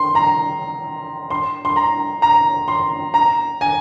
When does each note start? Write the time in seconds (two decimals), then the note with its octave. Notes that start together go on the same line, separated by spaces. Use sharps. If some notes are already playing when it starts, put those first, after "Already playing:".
Already playing: C6
0.15 A#5
1.30 C6
1.65 C6
1.76 A#5
2.22 A#5
2.68 C6
3.14 A#5
3.61 G#5